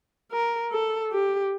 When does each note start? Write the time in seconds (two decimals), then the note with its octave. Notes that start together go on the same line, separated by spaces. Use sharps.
0.31 A#4
0.72 A4
1.12 G4